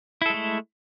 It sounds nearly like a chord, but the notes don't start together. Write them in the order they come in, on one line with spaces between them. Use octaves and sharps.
E4 A4 G#3 A3